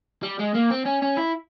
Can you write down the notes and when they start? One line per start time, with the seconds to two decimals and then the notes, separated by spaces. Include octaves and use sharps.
0.23 G3
0.39 G#3
0.55 A#3
0.71 C4
0.86 C#4
1.02 C#4
1.17 E4